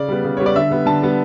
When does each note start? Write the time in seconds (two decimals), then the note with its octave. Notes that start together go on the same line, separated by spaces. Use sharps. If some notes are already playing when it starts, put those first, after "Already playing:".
Already playing: C#3 D5
0.08 G3 B3
0.24 C#3
0.37 G3 B3 C#5
0.46 D5
0.56 D3 E5
0.71 G3 B3
0.86 D3 A5
1.02 G3 B3